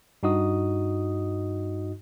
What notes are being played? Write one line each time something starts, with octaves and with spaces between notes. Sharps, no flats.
G2 D#4 F#4 D#5 D#6